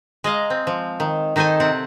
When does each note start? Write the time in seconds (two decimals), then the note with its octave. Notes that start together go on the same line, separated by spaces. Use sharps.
0.24 G#3 D#5 F5 A#5
0.50 C4
0.67 F3
1.00 D#3
1.36 D#3 D#4 A4 C5 G#5
1.60 C3 C4 D5 F#5